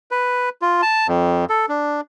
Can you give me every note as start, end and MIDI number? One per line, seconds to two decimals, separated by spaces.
0.11 0.49 71
0.62 0.81 65
0.82 1.07 81
1.08 1.45 41
1.49 1.66 69
1.69 2.01 62